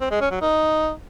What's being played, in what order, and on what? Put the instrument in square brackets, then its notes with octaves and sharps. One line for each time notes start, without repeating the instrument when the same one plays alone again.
[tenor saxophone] C4
G#3
C#4
F#3
D#4